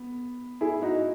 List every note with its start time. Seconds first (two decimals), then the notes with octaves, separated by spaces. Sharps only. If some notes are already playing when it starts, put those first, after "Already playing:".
Already playing: B3
0.61 E4 G#4
0.82 D#4 F#4